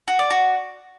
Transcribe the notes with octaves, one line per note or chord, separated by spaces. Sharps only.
F#4
D5
F#4